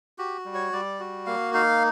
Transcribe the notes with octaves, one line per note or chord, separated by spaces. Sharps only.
F#4 G4
G3
C#5
G3 D5
F#4
A#3 F5
D#4 F5